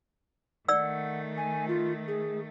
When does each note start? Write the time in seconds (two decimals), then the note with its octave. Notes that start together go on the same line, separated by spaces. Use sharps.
0.68 D#3 A3 D5 F#5 E6
1.37 G#5
1.68 F4
2.08 G#4